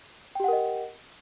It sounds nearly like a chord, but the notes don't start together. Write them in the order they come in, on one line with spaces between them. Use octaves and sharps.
G5 G4 F#5 A#4 D#5